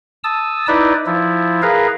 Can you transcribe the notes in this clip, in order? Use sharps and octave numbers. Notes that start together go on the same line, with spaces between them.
A5 D#6 E6
D#4 E4 B4 D5
F3 E4
G#4 A#4 B4 F5